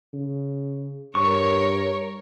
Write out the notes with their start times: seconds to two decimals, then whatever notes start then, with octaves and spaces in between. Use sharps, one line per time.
0.13 C#3
1.15 G2 A#4 C#5 C#6